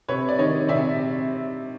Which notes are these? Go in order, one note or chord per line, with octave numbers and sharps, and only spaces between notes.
C3 B4 C#5
D5
D#3 C#5 D#5
C3 D5 E5